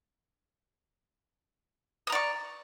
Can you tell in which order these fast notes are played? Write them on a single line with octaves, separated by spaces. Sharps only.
D#6 A#5 D5 C#6